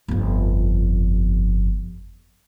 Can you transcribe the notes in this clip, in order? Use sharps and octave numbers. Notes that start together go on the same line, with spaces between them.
G1 F2